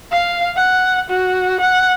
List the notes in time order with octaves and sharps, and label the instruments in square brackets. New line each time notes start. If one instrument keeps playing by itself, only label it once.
[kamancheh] F5
F#5
F#4
F#5